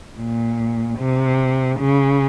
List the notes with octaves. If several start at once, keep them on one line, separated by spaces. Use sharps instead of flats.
A#2
C3
C#3